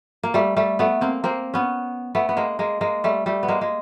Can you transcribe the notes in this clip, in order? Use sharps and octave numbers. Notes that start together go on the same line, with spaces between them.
A#3
G3 A3
G3 A3
A3 B3
A#3 C4
A#3 C4
B3 C#4
A3 B3
B3
G#3 A#3
G#3 A#3
G#3 A#3
G3 A3
G3 A3
B3
G#3 A#3
G#3